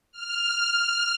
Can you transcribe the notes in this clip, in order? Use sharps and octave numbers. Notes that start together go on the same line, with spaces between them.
F6